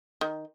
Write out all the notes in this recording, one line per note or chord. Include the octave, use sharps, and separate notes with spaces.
D#3